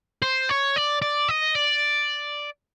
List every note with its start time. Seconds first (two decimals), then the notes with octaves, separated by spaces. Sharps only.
0.22 C5
0.49 C#5
0.76 D5
1.02 D5
1.28 D#5
1.55 D5